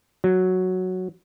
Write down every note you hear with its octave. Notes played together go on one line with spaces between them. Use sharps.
F#3